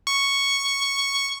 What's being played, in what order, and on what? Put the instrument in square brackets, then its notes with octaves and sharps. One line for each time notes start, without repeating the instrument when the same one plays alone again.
[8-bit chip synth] C#6